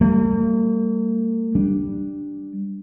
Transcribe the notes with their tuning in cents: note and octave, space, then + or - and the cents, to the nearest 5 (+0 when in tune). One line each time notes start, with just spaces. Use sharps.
G3 +5 A#3 -45
G3 +0 D4 +0